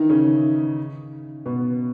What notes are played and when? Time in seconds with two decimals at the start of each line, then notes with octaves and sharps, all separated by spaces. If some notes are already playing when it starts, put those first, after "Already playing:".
Already playing: D#3 E3 D#4 E4
0.10 C#3 C#4
1.46 B2 B3